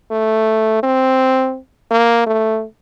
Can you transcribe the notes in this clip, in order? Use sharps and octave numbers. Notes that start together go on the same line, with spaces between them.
A3
C4
A#3
A3